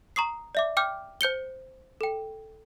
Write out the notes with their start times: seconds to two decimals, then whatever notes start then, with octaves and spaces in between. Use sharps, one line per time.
0.16 A#5 C#6 D#6 C7
0.55 D5 E5 D6
0.77 G5 D6 F6 G6
1.21 C5 G6 C#7 G7
2.01 A4 G5